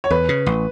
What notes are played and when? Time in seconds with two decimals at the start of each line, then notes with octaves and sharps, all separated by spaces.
0.04 C#5
0.11 E2 B4
0.29 C#3
0.46 A1